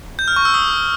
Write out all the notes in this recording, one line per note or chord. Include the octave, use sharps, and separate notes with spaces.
G6
F6
C#6
E6
D#6